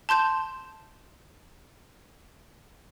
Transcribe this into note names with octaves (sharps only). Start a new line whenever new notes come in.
A5 C6 G6 E7